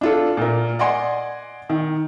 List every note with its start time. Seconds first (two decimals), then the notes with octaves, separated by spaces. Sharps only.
0.01 D4 F4 A4
0.37 A#2 A#4
0.79 D5 D#5 F#5 G#5 C6
1.69 D#3